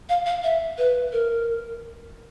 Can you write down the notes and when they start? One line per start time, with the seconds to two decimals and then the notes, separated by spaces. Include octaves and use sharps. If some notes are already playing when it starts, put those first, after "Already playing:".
0.09 F5
0.26 F5
0.44 E5
0.78 B4
1.13 A#4